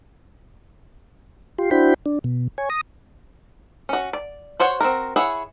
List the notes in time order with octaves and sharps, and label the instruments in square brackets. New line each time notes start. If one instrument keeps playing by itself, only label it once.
[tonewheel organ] F4 G4 C6
D4 E4 F#4 C5 G5 B5
D4
B2
C#5 G#5
D#6 A#6
[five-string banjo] C#4 F#4
D5
F#4 C5 C#5 F#5
C4 F4 F#4 A#4
E4 G#4 C#5 F#5